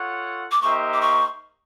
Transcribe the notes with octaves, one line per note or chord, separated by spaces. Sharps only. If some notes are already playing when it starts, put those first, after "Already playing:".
Already playing: F4 A4 C#5 F#5
D6
A#3 D#4 G4 C5 E5 C#6
D6
C#6